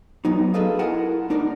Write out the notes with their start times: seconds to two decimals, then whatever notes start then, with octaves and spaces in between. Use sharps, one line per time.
0.25 F#3 B3 D#4
0.54 G#4 A4 B4 D#5 F5
0.79 E4 F4 A#4 F#5 G#5 A5
1.30 A#3 D4 D#4 A#4 D5